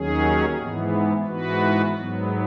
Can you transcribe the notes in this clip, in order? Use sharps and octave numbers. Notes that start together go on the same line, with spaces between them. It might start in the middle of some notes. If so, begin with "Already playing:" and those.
Already playing: D#2 D#3 F#3 C#4 G#4
G#2 E3 B3
G#2 E3 B3 F#4 B4
G#2 F#3 B3